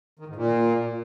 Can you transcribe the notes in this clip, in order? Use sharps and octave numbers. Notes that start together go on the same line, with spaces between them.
D#3
G#2
A#2